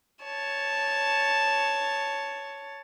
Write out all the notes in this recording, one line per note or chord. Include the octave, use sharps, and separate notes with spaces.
C#5 A5